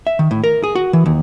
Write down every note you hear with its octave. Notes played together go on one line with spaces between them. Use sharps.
E5
D#3
A2
A#4
G#4
F#4
E3
D#2